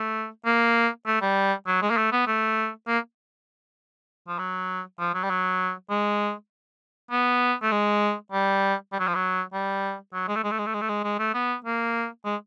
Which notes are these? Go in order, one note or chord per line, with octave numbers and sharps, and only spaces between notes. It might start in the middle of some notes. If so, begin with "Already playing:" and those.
Already playing: A3
A#3
A3
G3
F#3
G#3
A#3
A3
B3
A3
A#3
F3
F#3
F3
F#3
G3
F#3
G#3
B3
A3
G#3
G3
G3
F#3
F3
F#3
G3
F#3
G#3
A3
G#3
A3
G#3
A3
G#3
A3
G#3
G#3
A3
B3
A#3
G#3